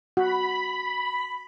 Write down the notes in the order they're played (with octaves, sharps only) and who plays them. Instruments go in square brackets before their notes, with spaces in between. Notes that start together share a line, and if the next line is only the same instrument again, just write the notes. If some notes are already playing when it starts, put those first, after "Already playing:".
[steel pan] F#4 [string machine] B5